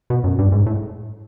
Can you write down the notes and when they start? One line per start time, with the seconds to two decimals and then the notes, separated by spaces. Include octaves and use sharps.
0.10 B2
0.24 F#2
0.38 G2
0.52 G#2
0.66 A2